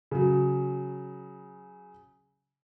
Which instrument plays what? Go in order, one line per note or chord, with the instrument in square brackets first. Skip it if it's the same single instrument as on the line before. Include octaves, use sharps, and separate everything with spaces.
[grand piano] C#3 F#3